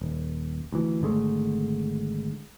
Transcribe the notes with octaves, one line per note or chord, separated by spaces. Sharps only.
D#1
D2 E3
G#1 D3 G#3 A3